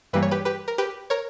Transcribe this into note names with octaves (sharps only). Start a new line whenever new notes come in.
G2 E3 G3 A#3 B4
C#5
G4 B4
G4 B4
A#4
G4 B4
A#4 C#5